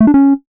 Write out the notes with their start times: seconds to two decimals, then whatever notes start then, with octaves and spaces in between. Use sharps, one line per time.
0.01 A3
0.07 D4
0.14 C#4